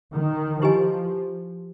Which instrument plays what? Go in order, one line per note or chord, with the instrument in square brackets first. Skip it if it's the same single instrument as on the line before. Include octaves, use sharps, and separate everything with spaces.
[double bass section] D#3
[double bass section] F3 [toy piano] E4 G4 B4 D#5 G#5